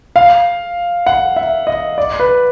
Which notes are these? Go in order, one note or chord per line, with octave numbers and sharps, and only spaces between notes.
F5
F#5
E5
D#5
D5
B4